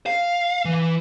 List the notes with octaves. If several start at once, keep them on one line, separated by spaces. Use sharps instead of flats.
F5
E3